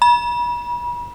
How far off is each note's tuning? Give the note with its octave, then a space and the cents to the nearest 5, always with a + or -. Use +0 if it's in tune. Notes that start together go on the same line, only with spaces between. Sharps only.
B5 -40